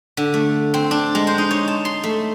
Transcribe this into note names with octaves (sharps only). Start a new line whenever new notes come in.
D3
A3
C4
D4
G#3
C5
D#4
C#5
A5
C6
A3